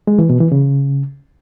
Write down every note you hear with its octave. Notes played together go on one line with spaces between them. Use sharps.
G#3
E3
B2
E3
C#3